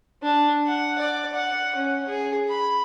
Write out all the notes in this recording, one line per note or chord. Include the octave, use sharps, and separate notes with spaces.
D4
F#5
D5
F#5
C#4
G#4
B5